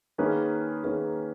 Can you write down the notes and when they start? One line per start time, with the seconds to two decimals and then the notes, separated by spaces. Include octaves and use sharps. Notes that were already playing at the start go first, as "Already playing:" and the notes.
0.18 D#3 A#3 C#4 G#4 B4
0.84 D#3 A#3 C#4 G#4 B4